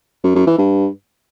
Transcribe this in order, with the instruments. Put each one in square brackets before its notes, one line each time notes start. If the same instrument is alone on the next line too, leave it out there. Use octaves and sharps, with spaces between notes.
[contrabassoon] F#2
F#2
E3
G2